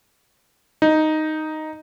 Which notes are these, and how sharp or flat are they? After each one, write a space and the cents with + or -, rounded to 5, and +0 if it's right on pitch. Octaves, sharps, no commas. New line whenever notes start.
D#4 +0